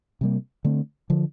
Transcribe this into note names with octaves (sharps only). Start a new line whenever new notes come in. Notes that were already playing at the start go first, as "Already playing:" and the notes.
C3 G3 A#3
D3 A3 C4
D3 F3